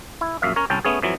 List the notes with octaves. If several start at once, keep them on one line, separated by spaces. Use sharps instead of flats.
E4
A#1 F#2 E5 F5
C#4 A#4 C#5
C2 C#4 G5 A5
A3 B3 C#4 G#4
F2 E3 F#3